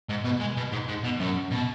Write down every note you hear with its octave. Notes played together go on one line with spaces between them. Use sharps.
G#2
B2
G#3
B2
G#2
G#2
B2
F#2
B2